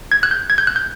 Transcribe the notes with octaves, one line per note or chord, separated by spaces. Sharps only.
G#6
F#6
G6
G#6
G6
F#6
G6